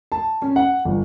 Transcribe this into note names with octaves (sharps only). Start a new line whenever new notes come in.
A5
C#4
F#5
G1